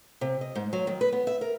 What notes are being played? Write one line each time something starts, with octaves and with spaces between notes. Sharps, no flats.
C3
D#5
G#2
F#3
D#3
B4
B3
E5
A#4